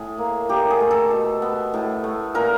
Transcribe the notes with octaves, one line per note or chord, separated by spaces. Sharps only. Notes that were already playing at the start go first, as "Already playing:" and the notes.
Already playing: A2 G#4
A#3
A#2 G4
G#4
A3
A4
B2
B3
A2
A3
A#2 A#4